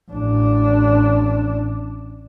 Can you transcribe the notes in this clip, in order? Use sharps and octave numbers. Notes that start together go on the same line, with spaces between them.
A1 D4